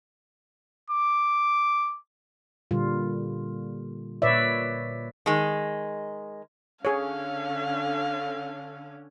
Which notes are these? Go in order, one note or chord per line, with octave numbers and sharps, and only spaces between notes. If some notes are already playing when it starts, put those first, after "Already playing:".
D6
A#2 D3 G3 F4
A#2 B4 C#5 D5 E5
D#3 G#3
D3 C#4 G#4 C#5 F5